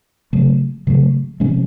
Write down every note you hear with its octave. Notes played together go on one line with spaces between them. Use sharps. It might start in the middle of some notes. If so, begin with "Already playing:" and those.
C#3 F#3 A3
C#3 F#3 A3
C3 F3 G#3 C#4